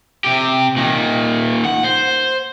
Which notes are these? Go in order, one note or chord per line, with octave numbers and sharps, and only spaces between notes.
C3 G4
A#2 D#3
F#5
C5